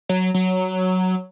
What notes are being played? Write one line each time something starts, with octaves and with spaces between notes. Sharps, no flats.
F#3
F#3